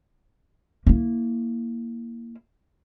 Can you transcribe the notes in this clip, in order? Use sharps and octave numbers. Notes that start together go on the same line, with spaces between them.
A#3 E4